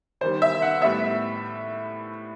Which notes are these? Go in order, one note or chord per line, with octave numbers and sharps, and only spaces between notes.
E2 D#3 G3 C5
E5
F#5
A2 G3 B3 E5